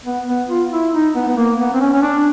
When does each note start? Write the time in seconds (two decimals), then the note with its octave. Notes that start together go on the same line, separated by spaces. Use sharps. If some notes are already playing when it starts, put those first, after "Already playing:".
0.06 B3
0.28 B3
0.49 F4
0.71 E4
0.93 D#4
1.15 B3
1.28 B3
1.37 A#3
1.59 B3
1.74 C4
1.81 C#4
1.93 C#4
2.02 D4